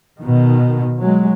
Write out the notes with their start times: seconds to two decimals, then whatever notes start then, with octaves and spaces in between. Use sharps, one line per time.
0.19 B2 D#3
0.99 F#3 G#3